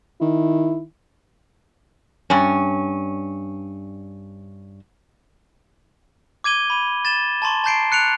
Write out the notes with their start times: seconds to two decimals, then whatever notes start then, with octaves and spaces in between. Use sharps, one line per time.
0.21 D#3 E4
2.30 G2 C#4
6.44 D6 G#6 D#7 G7
6.70 B5 D#7
7.05 A6 E7 G7
7.42 A5 A#5 C6 C#6
7.64 A5 A#5 G6 C7 D7
7.92 F#6 C#7 D7 F7